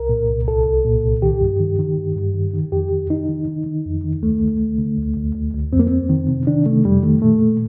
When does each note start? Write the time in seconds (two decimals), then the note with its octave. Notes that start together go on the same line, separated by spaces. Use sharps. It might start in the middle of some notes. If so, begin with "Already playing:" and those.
Already playing: C2 A#4
0.09 A#2
0.29 C2
0.48 C2 A4
0.66 C2
0.85 A#2
1.04 C2
1.22 D#3 G4
1.41 G2
1.60 D#3
1.79 D#3
1.98 G2
2.16 G2
2.34 D#3
2.53 D#3
2.72 F2 G4
2.91 D#3
3.10 D#3 D#4
3.29 D#3
3.47 D#3
3.66 D#3
3.86 F2
4.04 D#3
4.23 D2 A3
4.42 D2
4.60 D2
4.78 D3
4.98 D2
5.16 D2
5.35 D2
5.53 D2
5.73 F2 C4
5.79 A#3
5.87 F2 C4
6.09 D#3
6.29 C3
6.47 D#3 D4
6.66 C3 A3
6.85 F2 G3
7.03 D#3 A3
7.22 A#2 A3
7.42 A#2